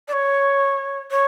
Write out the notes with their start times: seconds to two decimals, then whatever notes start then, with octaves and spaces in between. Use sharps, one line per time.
0.08 D5
0.13 C#5
1.11 C#5